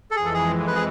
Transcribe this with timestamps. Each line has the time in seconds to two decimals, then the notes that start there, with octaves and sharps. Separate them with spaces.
0.11 A4
0.16 F2 E3 G#3 G#4
0.25 A4
0.34 G#4
0.67 B4
0.75 G#4